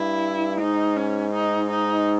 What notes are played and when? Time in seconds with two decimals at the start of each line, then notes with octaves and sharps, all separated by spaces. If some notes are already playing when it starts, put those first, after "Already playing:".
Already playing: G2 E4
0.60 G#2 D#4
0.97 C#4
1.33 D#4
1.70 D#4